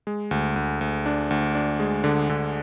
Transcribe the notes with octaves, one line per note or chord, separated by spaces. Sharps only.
G#3
D2
D2
D2
D4
D2
D4
G#3
D3
D3